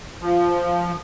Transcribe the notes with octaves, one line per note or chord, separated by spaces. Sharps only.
F3